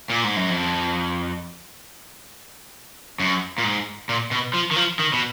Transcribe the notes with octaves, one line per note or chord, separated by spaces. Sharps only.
A#2
G#2
F#2
F2
F#2
A#2
G#2
A#2
B2
F3
D#3
F3
D#3
B2